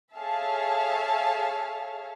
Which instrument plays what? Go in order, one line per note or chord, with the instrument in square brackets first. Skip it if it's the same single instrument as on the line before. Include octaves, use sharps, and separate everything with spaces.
[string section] G#4 A4 C#5 E5 F5 A5